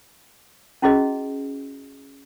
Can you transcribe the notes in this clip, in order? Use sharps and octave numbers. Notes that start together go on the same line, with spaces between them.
C#4 E4 F#4 G#4 D#5